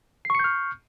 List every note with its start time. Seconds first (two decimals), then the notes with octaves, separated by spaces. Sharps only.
0.25 C7
0.30 C#6
0.35 C#7
0.39 G6
0.44 F6